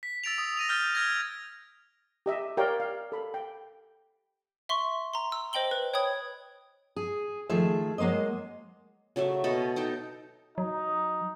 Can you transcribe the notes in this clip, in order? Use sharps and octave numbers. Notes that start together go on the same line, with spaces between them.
B6
E6 A6 D7 F7
D#6
A#6 D#7 F7
F6 G6 A6
F6 G#6 A#6
G4 D#5 E5
G4 A#4 C#5 D5 F5 G5
F5
A4 B5
G5
E5 C6 C#6
A#5 C6
E6
C5 D#5 G5 F#7 G7
B4
C#5 G5 B5 D#6 G#6
G#4
D#3 F3 A3 G#4 E5
F#3 G#3 A#3 C5 D#5
C#3 F#3 A3 E5
B2 A4 D#5 B5
D#4 A4 G5
F#3 D#4